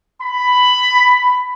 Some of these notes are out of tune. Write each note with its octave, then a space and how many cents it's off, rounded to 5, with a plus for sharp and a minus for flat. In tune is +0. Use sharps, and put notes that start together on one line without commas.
B5 +10